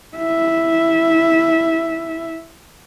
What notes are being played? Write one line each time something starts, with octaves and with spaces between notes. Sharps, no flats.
E4 E5